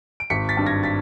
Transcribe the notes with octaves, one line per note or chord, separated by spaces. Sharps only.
D7
G#1 B6 C#7
A6 B6
G2
G#6 A#6
A6 B6